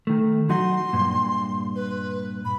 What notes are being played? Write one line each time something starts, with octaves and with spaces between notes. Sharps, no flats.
D#3 A3
F#3 D#4 F#4 C6
G2 A#2
B4
B5